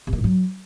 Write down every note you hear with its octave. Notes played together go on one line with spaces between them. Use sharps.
C3
A#3
G#2
F#3